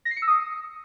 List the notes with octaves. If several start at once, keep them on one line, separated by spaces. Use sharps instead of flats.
A#6
C7
C#7
E6
D#6